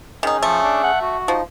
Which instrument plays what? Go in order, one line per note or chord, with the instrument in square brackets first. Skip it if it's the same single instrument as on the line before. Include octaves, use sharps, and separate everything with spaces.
[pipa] D#3 D#4 [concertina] C#4 G#4
[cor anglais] F3 [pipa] A3
[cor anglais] D4
F#5
F#4
[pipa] F3 [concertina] D#4